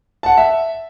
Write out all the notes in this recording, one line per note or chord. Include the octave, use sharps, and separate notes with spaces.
F#5 A5
E5